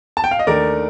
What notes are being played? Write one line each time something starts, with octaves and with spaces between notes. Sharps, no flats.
A5
G5
F5
D#5
D#2 D#3 A3 D4 A#4 D5